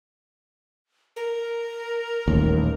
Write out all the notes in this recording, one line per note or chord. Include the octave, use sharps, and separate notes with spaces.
A#4
D#1 A1 D#2